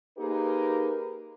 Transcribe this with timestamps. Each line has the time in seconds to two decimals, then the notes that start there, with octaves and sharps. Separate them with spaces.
0.18 A#3 D#4 G4 G#4 A#4 B4